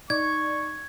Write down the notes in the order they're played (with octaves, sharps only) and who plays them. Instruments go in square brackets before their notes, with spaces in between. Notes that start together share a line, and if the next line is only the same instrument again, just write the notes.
[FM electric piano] D#4 D5 [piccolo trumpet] C#6 [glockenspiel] G#6